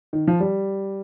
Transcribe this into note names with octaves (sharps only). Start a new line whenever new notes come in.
D#3
F3
G3